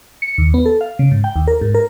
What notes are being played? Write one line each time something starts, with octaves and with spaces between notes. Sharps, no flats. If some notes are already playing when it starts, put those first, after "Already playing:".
C#7
D#2
B3
A4
F5
C#3
G#2
G5
D#2
A#4
G#2
A#4